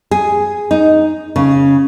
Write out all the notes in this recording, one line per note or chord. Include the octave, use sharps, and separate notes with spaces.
G#4
D#4
C#3